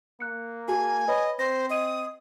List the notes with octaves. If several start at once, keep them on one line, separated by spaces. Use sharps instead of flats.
A#3 F#6 C#7
F#4 G#4 G#5 A5
B4 C#5 D#5 B5
C4 C5 A#6
D#5 D#6 D#7